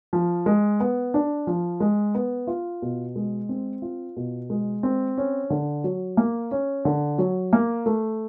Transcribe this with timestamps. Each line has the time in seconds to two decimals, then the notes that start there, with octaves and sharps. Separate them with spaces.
0.13 F3
0.46 G#3
0.80 B3
1.14 D4
1.47 F3
1.80 G#3
2.15 B3
2.47 F4
2.82 B2
3.16 G#3
3.49 C4
3.82 F4
4.16 B2
4.50 G#3
4.83 C4
5.17 C#4
5.50 D3
5.84 F#3
6.17 A#3
6.51 C#4
6.85 D3
7.18 F#3
7.53 A#3
7.86 A3